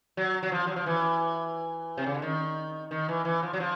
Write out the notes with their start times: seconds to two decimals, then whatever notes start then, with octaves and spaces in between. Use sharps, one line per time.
0.17 F#3
0.43 F#3
0.52 F3
0.67 F#3
0.76 F3
0.86 E3
1.97 C3
2.07 C#3
2.15 D3
2.22 D#3
2.91 D#3
3.09 E3
3.25 E3
3.43 F3
3.53 F#3
3.60 F3